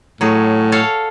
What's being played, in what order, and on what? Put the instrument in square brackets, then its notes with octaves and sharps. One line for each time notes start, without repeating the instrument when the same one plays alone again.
[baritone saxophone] A2 [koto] F#3 G#4
[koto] A4 C#5 F5